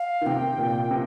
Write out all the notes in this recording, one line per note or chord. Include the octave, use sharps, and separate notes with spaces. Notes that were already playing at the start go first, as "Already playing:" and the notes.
Already playing: F5
D#3
C3 G5
A#2
C3